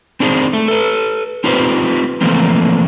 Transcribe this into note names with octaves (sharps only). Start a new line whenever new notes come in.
C4 D4 D#4 G#4 A4 C5
A3
A4 B4
C4 D#4 F4 G4 B4 C5
E3 F3 A3 A#3 C4